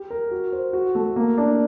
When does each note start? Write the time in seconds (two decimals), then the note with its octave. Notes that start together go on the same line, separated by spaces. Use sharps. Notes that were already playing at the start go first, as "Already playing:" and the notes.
Already playing: G4
0.10 A#4
0.31 F#4
0.53 C5
0.73 F#4
0.95 A3
1.16 A#3
1.38 D4